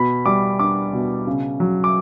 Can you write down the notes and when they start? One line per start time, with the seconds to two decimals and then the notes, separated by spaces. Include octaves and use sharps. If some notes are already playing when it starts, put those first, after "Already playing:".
Already playing: B2 B5
0.26 G3 D6
0.59 D4 D6
0.93 B2
1.27 C#3
1.60 F#3
1.84 D6